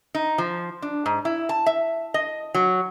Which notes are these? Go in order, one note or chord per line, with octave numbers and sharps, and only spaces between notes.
D#4
F3
D4
G#2
E4
A5
E5
D#5
F#3